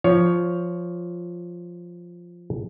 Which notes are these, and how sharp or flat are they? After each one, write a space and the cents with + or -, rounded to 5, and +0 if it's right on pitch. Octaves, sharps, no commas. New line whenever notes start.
F3 +0 C#5 +15